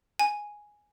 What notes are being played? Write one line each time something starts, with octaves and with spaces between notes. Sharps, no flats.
G#5